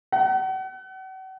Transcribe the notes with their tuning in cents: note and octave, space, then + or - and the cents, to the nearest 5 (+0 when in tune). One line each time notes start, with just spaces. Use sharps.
F#5 +40